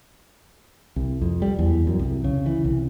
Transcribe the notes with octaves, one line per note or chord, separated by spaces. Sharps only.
C2
F2
G3
E2
F#2
C2
C#3
E3
C2